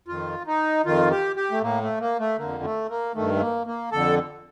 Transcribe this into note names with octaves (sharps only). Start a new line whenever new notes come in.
F2 D#3 F4
D#4
F2 D#3 F4
G4
G4
A3
A2 A#3
A3
A#3
A3
F2 D3 A#3
A3
A#3
G2 D#3 A3
A3
A#3
A#3
F2 D3 A4